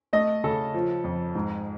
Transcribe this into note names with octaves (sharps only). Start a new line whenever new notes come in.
A3 D#5
C#3 A4
F3
F2
G#2